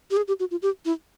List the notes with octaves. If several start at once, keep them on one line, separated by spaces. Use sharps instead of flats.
G4
G#4
G4
F#4
F4
G4
E4